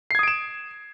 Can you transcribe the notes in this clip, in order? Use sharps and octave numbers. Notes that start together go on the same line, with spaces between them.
D#6 G#6 C7 D7 E7